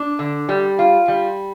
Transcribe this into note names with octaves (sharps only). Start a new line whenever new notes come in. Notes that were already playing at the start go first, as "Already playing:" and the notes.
Already playing: D4
D3
G3
F4
G3